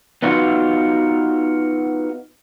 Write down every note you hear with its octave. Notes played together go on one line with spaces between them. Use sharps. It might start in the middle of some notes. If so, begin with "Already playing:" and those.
B3 D#4 F4 F#4